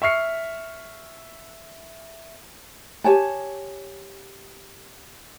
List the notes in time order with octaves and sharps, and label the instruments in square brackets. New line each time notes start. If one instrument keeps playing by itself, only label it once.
[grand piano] E5 C#6 F6 C7 C#7
[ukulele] G4 C#5 G#5 A5